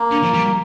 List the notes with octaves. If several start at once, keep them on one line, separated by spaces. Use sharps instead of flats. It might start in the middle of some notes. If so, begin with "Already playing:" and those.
Already playing: A#3
D3
F3
G3